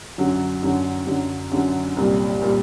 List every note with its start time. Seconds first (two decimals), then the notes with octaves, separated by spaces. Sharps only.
0.18 F#2 D3 F#3
0.63 F#2 D3 F#3
1.07 F#2 D3 F#3
1.52 F#2 D3 F#3
1.97 C2 A#2 G3
2.42 A#2 G3